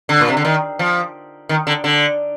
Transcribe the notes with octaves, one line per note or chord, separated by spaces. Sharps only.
D3
A#2
C3
D3
D#3
F3
D#3
D3
D3